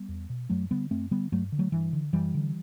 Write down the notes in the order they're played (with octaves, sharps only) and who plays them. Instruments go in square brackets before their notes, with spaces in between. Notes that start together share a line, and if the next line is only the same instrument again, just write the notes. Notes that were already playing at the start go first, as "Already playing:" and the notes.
Already playing: [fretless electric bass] G3 B3
E2
B2
F#2 F#3 A3
D3 G3 B3
F#2 A3 C4
D3 G3 B3
G2 F#3 A3
D3
F#3 A3
G2 E3
D3
F#2 E3 G3
D3